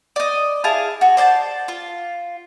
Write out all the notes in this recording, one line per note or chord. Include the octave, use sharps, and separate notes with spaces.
D5 D#5
E4 G#4 F5 A5
F#4
C5 D5 G#5 A5
F4